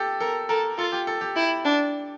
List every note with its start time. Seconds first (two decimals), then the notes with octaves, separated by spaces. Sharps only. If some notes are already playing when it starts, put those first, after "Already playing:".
Already playing: G4 A4
0.20 A4 A#4
0.49 A4 A#4
0.78 F4 A4
0.92 G4
1.07 A4
1.21 G4
1.35 E4 G4
1.65 D4